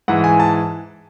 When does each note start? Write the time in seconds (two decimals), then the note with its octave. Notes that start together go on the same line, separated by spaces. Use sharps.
0.08 G#2 E3 F#5
0.24 G#5
0.40 A5